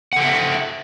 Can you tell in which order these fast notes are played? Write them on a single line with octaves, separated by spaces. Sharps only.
F#5 A4 G5 E5